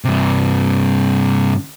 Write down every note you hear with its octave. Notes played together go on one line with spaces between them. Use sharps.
G2 C3